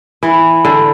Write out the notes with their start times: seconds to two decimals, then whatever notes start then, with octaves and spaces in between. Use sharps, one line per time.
0.23 E3 B3 E4 B4
0.65 D3